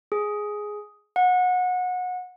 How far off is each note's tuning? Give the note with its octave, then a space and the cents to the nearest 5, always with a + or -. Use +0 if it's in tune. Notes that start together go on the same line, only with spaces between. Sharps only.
G#4 +5
F#5 -25